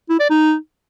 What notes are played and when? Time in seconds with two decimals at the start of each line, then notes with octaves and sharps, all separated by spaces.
0.10 E4
0.20 D5
0.30 D#4